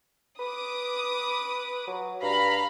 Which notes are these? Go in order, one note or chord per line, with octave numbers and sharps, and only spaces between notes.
B4 D6 D#6
F#3
G2 F5 A#5 B5